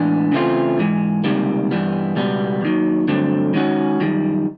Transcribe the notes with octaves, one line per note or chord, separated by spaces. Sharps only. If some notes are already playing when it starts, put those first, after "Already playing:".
Already playing: A2 E3 G#3 B3 D4
C#3 E3 A3 C4 F4
G#2 E3 G#3
C#2 C3 D#3 G3 A#3
G2 E3 G3 B3
C#2 B2 G3 B3
D#2 D#3 F#3
G2 D3 F#3 A3 C4
D#3 G#3 C#4 F#4
F#2 D#3 G3